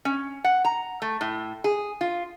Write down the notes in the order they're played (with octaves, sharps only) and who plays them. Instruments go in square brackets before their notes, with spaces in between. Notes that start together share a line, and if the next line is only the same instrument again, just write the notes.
[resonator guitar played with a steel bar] C#4
F#5
A#5
A3
A2
G#4
F4